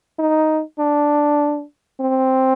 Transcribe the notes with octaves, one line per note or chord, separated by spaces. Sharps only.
D#4
D4
C4